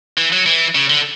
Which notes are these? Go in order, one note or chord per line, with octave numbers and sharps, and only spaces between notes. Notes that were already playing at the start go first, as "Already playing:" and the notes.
E3
F#3
E3
C#3
D3